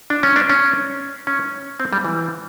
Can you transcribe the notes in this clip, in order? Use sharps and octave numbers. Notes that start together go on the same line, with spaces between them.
D4
C#4
D4
C#4
C#4
C4
G3
E3